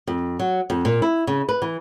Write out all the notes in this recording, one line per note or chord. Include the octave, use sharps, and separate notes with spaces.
F2
F#3
F2
A#2
E4
C#3
B4
E3